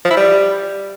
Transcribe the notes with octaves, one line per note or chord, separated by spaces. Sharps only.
F3
E4
G3